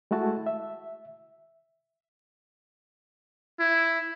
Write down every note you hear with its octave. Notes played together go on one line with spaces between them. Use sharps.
G#3 A3 E4 F#4 A5
E5
E4